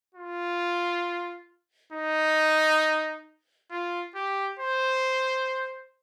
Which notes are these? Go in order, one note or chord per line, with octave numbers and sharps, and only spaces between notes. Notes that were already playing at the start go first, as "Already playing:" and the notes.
F4
D#4
F4
G4
C5